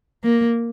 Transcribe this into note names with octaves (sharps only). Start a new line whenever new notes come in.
A#3